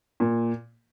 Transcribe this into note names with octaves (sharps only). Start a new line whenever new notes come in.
A#2